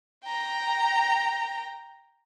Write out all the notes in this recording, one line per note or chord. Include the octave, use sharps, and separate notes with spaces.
G5 A#5